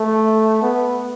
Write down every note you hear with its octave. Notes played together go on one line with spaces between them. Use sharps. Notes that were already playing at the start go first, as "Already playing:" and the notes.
Already playing: A3
B3